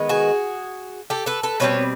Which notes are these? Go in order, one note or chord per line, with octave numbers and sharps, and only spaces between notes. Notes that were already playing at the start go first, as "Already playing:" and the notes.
Already playing: D#3 G#3 B3
F#4 G#4
G4 A4
A4 B4
A4 B4
B2 G3 C4 B4 C#5